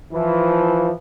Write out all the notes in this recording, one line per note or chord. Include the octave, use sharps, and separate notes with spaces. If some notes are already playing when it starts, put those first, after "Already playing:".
E3 F3